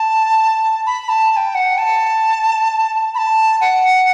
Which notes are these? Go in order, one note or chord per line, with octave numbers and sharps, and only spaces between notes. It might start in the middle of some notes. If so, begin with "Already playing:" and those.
Already playing: A5
B5
A5
A5
G5
F#5
A5
B5
A5
F#5